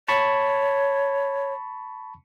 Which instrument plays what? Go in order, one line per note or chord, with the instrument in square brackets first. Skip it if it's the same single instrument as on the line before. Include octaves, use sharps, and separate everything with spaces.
[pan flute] C#5 [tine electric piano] A5 B5 C#6